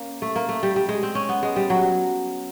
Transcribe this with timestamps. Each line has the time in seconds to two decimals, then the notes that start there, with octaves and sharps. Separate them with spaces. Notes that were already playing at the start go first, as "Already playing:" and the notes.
Already playing: A#3 C#4
0.22 A3
0.36 A#3
0.49 A3
0.63 G3
0.76 G3
0.89 G#3
1.03 C4
1.15 C#4
1.29 B3
1.43 G#3
1.56 G3
1.70 F#3